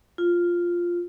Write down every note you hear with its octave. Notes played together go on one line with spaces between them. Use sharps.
F4